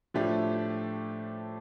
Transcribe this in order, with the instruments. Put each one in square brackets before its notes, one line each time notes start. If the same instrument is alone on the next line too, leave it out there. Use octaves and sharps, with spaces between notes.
[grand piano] A2 F3 A3 D4 G4